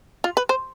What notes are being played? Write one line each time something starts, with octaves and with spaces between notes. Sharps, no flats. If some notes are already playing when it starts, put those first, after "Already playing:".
F4
B4
C5